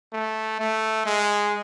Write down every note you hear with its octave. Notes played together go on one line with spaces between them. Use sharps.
A3
A3
G#3